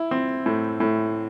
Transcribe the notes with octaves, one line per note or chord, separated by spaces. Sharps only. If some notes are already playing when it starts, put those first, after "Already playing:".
Already playing: E4
C4
A2
A2